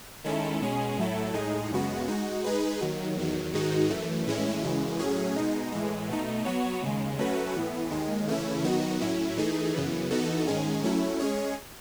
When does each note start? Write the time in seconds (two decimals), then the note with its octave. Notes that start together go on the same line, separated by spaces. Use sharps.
0.24 D#3 G#3 C#4 E4 A4
0.61 B2 G#3 C#4 G#4
0.98 A2 F#3 A3 E4 A4
1.34 A2 G#3 D#4 G#4
1.71 F#2 C#3 G#3 B3 F#4
2.08 G#3 D#4 F#4
2.44 G#3 D#4 G#4 B4
2.81 D#2 D#3 F#3
3.17 E2 D#3 F#3
3.53 G#2 D#3 G#3 D#4 F#4
3.90 F#2 E3 A3
4.27 A2 E3 G#3 C#4 E4
4.62 F#2 C#3 E3 G#3
4.99 A2 F#3 C#4 G#4
5.36 B2 G#3 D#4
5.72 A2 E3 G#3
6.09 B2 A3 D#4
6.45 F#3 B3 F#4 C#5
6.82 D#2 C#3 G#3
7.18 F#3 A3 C#4 F#4 B4
7.55 A2 E3 B3
7.91 D#2 D#3 G#3
8.27 C#3 E3 A3 C#4 E4
8.64 D#3 F#3 B3 D#4 F#4
9.01 A2 F#3 C#4 E4
9.37 E3 A3 D#4 G#4
9.74 F#2 C#3 E3 B3
10.11 E3 B3 D#4 F#4 A4
10.48 G#2 D#3 G#3 C#4 G#4
10.83 F#3 A3 C#4 E4
11.19 G#3 C#4 G#4 C#5